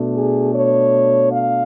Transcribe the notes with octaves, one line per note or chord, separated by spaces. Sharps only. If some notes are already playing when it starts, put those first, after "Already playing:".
Already playing: B2 A3 D4
G#4
C#5
F5